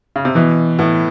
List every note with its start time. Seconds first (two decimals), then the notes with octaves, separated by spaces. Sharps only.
0.16 C#3
0.25 C3
0.35 B2 E3
0.79 A2 B3